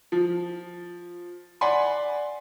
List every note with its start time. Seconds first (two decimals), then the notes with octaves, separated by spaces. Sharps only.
0.12 F3
1.61 D5 F#5 G#5 B5 C6